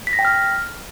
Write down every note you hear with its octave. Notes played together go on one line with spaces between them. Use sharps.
B6
A#6
G5
F6